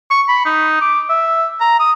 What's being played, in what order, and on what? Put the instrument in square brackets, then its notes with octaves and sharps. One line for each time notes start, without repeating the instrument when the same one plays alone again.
[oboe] C#6
B5
D#4
D6
E5
A#5
D#6